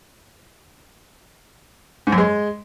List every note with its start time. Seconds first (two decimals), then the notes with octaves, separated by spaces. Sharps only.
2.07 G#2
2.12 F#2
2.18 G#3